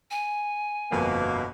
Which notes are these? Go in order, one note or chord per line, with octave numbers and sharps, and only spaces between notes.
G#5
G1 F2 B2 A#3 F#5